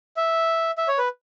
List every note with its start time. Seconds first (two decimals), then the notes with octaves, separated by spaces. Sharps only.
0.17 E5
0.78 E5
0.88 C#5
0.98 B4